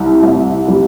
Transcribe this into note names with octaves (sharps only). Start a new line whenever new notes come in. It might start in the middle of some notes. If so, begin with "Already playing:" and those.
Already playing: C2
C2
G3